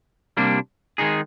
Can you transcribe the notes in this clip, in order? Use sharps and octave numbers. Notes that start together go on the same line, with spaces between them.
C3 G3 A#3 D4
D#3 G#3 D#4 G#4